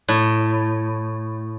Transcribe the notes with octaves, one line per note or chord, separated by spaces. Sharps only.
A2